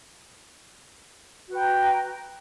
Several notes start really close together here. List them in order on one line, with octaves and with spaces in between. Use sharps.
F#4 B4 G5 A#5